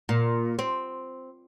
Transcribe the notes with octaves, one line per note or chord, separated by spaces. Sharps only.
A#2
C4